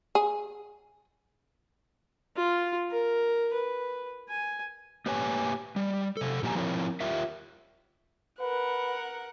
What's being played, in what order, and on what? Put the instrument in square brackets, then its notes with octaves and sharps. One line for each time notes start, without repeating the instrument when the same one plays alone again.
[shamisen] G#4
[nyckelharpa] F4
A#4
B4
G#5
[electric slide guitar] A#3 G4 B4 C#5 G#5
G3
C3 A4
A#2 F3 A#3 G4 G#5 A#5
F3 C4 E4 A#4 C#5
F4 G4 A#4 E5
[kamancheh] A#4 F#5 [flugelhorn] B4